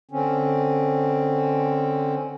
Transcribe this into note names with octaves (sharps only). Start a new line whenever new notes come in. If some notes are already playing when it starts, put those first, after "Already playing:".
D3 C4 C#4